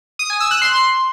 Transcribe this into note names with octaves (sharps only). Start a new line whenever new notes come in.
D#6
G#5
E6
F#6
C6